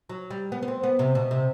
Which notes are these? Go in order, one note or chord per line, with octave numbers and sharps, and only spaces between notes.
F#3
G3
B3
B3
C4
B3
C3
B2
C3